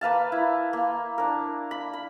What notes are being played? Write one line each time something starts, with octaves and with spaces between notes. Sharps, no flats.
A#3 B4 F5 A5
E4
A#3
D4 A#4
B5
B5